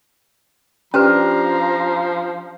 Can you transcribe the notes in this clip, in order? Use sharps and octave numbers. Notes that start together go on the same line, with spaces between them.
F3 C#4 D4 G4 B4 A#5